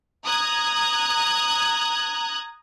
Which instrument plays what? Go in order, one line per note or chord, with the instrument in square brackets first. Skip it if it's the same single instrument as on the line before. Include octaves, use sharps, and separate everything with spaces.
[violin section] A#5 D#6 F#6 G#6